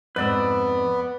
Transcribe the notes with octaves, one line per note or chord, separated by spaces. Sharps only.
F2 G#2 B3 B4 D5 E6